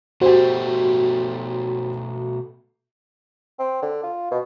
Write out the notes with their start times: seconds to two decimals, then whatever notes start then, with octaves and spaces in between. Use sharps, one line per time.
0.21 B2 A3 F#4 G4 C5
3.59 C4
3.82 D3
4.03 F4
4.31 B2